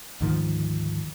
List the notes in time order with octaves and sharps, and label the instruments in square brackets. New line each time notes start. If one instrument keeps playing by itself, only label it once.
[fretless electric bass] D2 G#2 D#3 F3